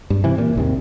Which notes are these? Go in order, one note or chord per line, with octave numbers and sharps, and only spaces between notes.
G2
C3 E3
A#2
G#1 D#2 C3